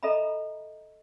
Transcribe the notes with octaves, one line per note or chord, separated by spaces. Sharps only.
A4 D#5 E5 A#5 B5